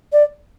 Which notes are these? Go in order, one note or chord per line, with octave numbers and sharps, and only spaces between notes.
D5